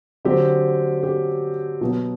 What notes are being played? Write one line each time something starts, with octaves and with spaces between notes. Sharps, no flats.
D3 F#3 C4 G4
G4
B2 F#3 B3